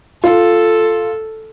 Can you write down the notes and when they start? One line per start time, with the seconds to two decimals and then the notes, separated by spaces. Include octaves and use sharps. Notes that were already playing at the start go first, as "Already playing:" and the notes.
0.24 F4 A4